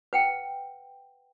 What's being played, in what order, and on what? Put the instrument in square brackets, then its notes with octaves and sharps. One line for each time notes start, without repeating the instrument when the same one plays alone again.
[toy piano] B4 F#5 G5